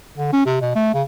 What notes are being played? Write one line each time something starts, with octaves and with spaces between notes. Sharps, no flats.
D3
C#4
C3
B2
A3
C#3